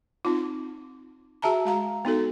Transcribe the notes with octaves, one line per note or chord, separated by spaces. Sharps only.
C4 D#4 F4
F#4 G#4 E5 A5 A#5
G#3 F5 A#5
B3 D#4 F#4 A4